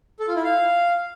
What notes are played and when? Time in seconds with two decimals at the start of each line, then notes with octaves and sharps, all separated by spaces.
0.19 A4
0.28 F4
0.36 E4
0.44 F5